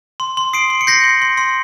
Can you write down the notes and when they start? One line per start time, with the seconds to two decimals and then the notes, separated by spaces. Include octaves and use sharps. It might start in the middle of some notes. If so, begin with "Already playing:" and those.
0.20 C6
0.37 C6
0.53 D#6 C7 D7
0.70 C6
0.81 C#7
0.87 G6 A#6 C7
1.04 C6
1.22 C6
1.37 C6